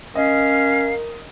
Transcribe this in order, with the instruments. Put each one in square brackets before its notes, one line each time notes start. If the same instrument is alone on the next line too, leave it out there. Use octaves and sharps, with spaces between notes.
[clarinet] C#4 [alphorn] A#4 [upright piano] D#5 [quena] F5